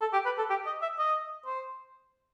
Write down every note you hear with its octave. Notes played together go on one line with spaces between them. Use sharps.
A4
G4
B4
A4
G4
D#5
E5
D#5
C5